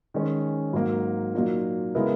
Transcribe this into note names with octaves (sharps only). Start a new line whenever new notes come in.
D#3 G#3 C#4
G#2 F#3 A#3
A#2 F#3 A#3 D#4
C#3 G#3 B3 E4 A#4